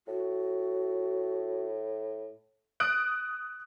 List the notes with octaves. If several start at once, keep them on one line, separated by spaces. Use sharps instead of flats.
A2 F#4
D#6 F#6 D7